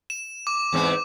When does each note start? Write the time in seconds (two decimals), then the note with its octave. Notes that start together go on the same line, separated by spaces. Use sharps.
0.10 E7
0.47 D6
0.73 E2 G#2 C4